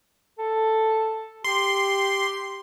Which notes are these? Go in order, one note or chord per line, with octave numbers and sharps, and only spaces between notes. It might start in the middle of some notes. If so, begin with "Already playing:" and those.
A4
G4 C6